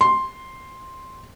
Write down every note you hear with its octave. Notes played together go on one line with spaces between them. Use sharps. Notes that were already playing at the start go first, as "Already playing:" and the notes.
C6